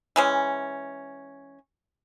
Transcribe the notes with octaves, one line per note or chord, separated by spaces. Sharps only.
E3 G#3 C#4